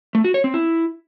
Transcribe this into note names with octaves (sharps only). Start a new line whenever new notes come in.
A3
F#4
C#5
C4
E4